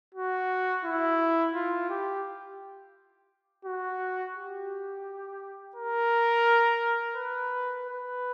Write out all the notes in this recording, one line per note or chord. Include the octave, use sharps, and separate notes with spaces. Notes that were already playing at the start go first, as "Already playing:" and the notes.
F#4
E4
F4
G4
F#4
G4
A#4
B4
B4